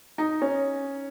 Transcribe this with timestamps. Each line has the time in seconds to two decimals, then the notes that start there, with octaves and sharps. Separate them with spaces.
0.18 D#4
0.42 C#4